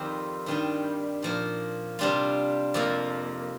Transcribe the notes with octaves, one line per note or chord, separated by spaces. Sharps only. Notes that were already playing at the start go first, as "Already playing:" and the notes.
Already playing: F2 D#3 G3 C4 G4
G2 D#3 G3 D4 G4
A#2 F3 A#3
C3 G3 D4 F4
F2 C3 F3 A#3